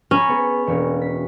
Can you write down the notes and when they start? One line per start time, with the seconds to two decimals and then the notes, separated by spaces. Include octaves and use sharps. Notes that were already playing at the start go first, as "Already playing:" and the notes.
0.11 C#4 A#5 B5
0.28 B3 G#4
0.67 E1 A#3 F#4
1.02 B6